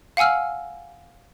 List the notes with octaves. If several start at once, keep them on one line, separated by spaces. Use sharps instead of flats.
F5 F#5 G#5 E6 F6